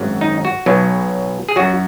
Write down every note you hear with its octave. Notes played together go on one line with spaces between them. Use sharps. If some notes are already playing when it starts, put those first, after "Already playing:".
Already playing: G#1 F#2 F#3
D#4
F#4
B1 B2 F#3
G#4
F#2 F#3 F#4